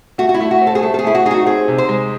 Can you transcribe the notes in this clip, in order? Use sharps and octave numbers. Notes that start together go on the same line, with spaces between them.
A3 F#4
F#4
E4
A3
F#4
C4
A4
G#4
A3 A4
A4
G#4
A3 E4
F#4
D#4 G#4
F#4
C4 G#4
C3
C5
G#3